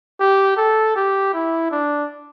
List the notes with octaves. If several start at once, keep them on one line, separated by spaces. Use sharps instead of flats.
G4
A4
G4
E4
D4